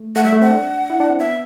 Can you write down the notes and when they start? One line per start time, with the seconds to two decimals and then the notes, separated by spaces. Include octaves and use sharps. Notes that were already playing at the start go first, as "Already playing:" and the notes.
Already playing: A3
0.16 A3 F#5
0.24 G3 E5
0.33 A3
0.42 C4 F#5
0.51 D4
0.90 E4
1.00 D4
1.10 C4
1.19 B3 E5